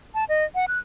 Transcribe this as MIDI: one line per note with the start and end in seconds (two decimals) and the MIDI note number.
0.15 0.24 81
0.29 0.45 75
0.55 0.66 78
0.68 0.79 90